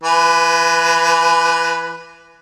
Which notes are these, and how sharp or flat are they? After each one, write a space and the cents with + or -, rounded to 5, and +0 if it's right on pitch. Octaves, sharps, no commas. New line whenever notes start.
E3 +30 B4 +0